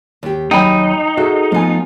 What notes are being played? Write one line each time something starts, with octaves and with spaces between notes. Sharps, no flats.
D#2 G4
D#2 F#3 D#4 G5 G#5 B5
F#4 G#4 A4 E5
F3 A3 B3 F4 G#5